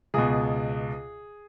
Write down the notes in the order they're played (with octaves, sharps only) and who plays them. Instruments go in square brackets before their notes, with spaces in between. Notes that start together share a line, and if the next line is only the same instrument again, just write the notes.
[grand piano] C#2 B2 G#4